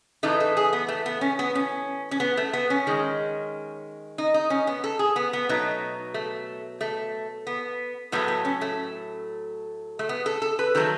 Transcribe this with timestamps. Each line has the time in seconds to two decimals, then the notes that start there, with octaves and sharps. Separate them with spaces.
0.23 A2 E3 A3 D#4
0.40 A4
0.57 G#4
0.73 B3
0.88 A3
1.06 B3
1.21 C#4
1.39 B3
1.55 C#4
2.11 C#4
2.20 B3
2.37 A3
2.53 B3
2.70 C#4
2.87 D#3 G#3
4.18 D#4
4.34 D#4
4.50 C#4
4.67 B3
4.84 A4
4.99 G#4
5.16 B3
5.33 B3
5.49 B2 F#3 A3 D#4
6.14 A3
6.81 A3
7.47 B3
8.12 A2 F#3 A3 B3
8.28 B3
8.45 C#4
8.61 A3
9.99 A3
10.09 B3
10.26 A4
10.42 A4
10.59 B4
10.75 D#3 F#3 A3 A4